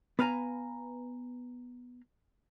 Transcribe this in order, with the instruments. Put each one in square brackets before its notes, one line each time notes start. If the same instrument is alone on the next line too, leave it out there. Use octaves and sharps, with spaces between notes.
[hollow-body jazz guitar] B3 B4 F5 G#5 A#5